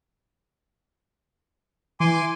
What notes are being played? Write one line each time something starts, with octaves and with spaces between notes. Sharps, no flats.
E3 G#5 C6 D6